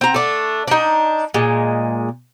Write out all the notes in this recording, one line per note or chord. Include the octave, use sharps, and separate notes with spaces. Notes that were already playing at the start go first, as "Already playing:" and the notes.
C4 A#5
A3 D4
D4 D#4
A#2 G#3